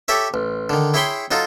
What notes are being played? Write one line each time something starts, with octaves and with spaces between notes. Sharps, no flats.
G4 A4 C#5 E5
A1
D3 D#3
E4 G#4 C#5 G5 B5 C6
F#3 D#4 F4 A4